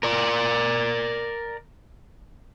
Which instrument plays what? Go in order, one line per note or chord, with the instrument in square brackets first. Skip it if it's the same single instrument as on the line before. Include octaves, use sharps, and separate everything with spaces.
[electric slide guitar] A#4 D5